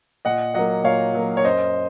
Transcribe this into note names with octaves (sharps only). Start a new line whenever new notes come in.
A#2 D#5 F#5
F#3 A#3 D#5 F#5
A#2 C#5 F5
F#3 A#3
C#5
F#2 C5 D#5